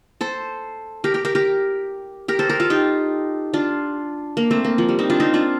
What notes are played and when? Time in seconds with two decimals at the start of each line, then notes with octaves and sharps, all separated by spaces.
0.21 A4 C5
1.04 G4 A#4
1.14 G4 A#4
1.25 G4 A#4
1.35 G4 A#4
2.28 G4 A#4
2.39 A4 C5
2.49 G4 A#4
2.60 F4 A4
2.70 D#4 G4
3.53 D4 F4
4.37 A#3
4.51 A3 C4
4.65 A#3
4.78 F3
4.89 G3
4.99 C4 D#4
5.10 D4 F4
5.20 C4 D#4
5.34 D4 F4